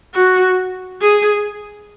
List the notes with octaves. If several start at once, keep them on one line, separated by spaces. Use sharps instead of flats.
F#4
G#4